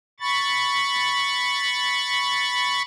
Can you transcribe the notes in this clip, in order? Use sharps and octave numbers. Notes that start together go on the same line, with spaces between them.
B5 C#6 A6